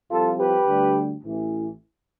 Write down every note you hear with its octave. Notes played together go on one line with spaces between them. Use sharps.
C2 C3 F3 F4 A4
G4 B4
D2 D3 G3
A1 A2 E3